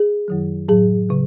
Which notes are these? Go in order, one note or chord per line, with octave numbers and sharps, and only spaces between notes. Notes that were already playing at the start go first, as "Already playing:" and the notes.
Already playing: G#4
F#2 D#3 F#3
A2 F#3 G#4
C#3 F#3